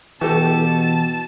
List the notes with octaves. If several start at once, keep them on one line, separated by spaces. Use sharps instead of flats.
B2 E3 F#4 G4 A4 A5